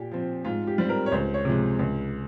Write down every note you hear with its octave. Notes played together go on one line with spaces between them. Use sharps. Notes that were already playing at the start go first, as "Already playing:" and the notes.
Already playing: A#2 G4
F3 C4
G#2 F4
G4
G3 C4
A#4
C#5
C#2 C5
C#5
C3 F3 G#3
C#2